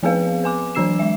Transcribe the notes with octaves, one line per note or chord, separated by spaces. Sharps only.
F3 B3 C4 G#4 B4 F5
B4 G#5 D6
E3 F#3 D4 E6 C7 E7
G#3 E5